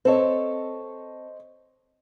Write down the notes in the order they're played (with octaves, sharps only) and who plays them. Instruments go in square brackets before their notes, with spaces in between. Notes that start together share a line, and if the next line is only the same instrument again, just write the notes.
[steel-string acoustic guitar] C4 A4 C#5 [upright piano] C5 D#5